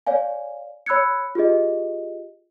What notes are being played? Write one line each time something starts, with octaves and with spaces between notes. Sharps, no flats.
C#5 D5 F5 G#5
C#5 B5 E6 F#6 G#6 C#7
F4 G4 G#4 D#5